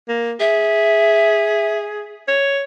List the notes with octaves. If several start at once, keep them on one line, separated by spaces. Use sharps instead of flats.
A#3
G#4 E5
C#5